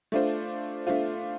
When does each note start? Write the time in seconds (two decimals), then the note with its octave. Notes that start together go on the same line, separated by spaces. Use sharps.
0.12 A3 D4 F4 C5
0.87 A3 D4 F4 C5